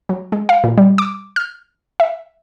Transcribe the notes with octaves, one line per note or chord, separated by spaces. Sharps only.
F#3
G#3
F5
A#2
G3
D6
F6
E5